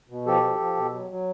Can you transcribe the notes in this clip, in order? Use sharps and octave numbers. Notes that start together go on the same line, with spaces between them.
B2
F3 G4 A4
F3
F3
B2
F#3
F#3